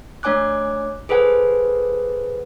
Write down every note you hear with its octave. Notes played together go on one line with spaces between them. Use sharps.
A3 D4 C#5 G#5 D6 F#6
G#4 A4 B4 C5 F#5 G#5